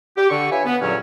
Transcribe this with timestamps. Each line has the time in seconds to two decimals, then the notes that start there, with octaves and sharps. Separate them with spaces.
0.17 G4
0.30 D3 C#6
0.51 F4 B4 C#5 E5 G#5
0.66 B3
0.82 E2 G2 A#2 D3 F#3 C#4